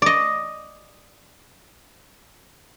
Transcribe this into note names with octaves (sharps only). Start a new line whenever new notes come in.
D5 D#5